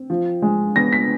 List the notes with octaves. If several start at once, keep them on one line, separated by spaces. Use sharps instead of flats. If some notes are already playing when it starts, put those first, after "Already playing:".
Already playing: C4
F3
G#3
B3 A#6
B6